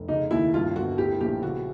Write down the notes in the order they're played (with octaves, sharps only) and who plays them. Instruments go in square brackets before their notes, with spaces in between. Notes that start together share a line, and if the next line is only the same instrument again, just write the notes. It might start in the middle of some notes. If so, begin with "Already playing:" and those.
Already playing: [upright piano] F1
[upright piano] C#3 [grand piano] D#4
[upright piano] D#2 [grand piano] E4
[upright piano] G2 [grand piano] F4
[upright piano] G1 [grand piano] F#4
[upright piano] A2 [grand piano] G4
[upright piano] A#1 [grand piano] G4
[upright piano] C#3 [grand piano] F#4